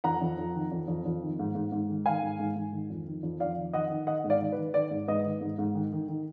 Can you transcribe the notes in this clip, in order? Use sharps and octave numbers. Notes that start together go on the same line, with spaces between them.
F2 F#5 A#5
F2
F2
D#3
F2
F2
F2
D#3
G#2
G#2
G#2
D#3
D#3 F5 G#5
G#2
G#2
G#2
D#3
F2
D#3
F2
F2 D5 F5
D#3
D#3 D#5 F#5
D#3
D#3 D#5 F#5
G#2
D5 F5
D#3
B4
D#3
D#3 D5
G#2
G#2 B4 D#5
D#3
G#2
G#2
D#3
D#3
D#3